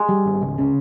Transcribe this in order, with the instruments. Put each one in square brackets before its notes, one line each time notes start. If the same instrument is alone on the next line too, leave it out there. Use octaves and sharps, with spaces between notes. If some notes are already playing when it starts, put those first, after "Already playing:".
Already playing: [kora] G#3
[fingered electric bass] G3
G#1
C#2
C#3